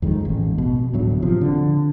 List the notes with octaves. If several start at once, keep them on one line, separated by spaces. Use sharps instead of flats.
F2 D#3 G#3
A1
B2
D2 A2 F#3
C3 F3
D3